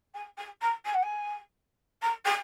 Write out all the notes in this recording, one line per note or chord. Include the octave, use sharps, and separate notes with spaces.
G#5
G#5
A#5
G#5
F#5
G#5
A#5
G#5